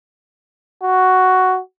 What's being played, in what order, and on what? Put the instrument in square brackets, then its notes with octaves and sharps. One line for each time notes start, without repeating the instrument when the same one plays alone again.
[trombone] F#4